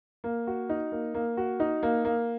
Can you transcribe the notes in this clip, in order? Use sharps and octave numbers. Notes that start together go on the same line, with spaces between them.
A#3
F#4
D#4
A#3
A#3
F#4
D#4
A#3
A#3